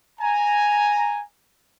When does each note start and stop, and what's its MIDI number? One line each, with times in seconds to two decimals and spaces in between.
0.20 1.23 80
0.20 1.23 82